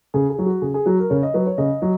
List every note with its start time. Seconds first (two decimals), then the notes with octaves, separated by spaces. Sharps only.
0.14 C#3 G#4
0.30 G#4
0.39 F#3
0.46 F#4
0.62 C#3 G#4
0.74 G#4
0.86 F#3 F#4
0.99 A#4
1.10 C#3 C#5
1.23 D#5
1.34 F#3 B4
1.47 C#5
1.58 C#3 D#5
1.82 F#3